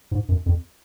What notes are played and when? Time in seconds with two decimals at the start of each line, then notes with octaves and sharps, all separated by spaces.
0.11 G#2
0.29 F#2
0.46 F2